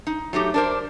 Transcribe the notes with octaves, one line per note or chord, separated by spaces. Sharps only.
D#4
F#3 A3 D#4 G4
D4 A#4 C5